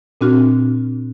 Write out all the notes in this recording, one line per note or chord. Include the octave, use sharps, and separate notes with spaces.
A#2 C4 D4 F#4 F6